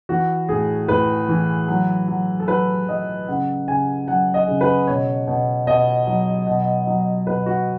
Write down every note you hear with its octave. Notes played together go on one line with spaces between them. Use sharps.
E3 F#4
A2 G#4
A2 B4
E3
F#3
F#3
A4
F#3 B4
F#3 D#5
C#3 F#5
C#3 G#5
F#3 F#5
D#5
C#3
B4
B2 C#5
B2
B2 D#5
F#3
B2
F#3
B2 B4
F#4